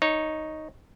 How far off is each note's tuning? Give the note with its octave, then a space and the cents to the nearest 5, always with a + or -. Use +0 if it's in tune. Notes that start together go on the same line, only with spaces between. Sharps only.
D#4 +0 C#5 +0